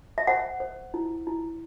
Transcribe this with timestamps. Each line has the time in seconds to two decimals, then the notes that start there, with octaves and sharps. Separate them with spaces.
0.18 E5
0.27 C5 F#5
0.60 C5
0.94 E4
1.27 E4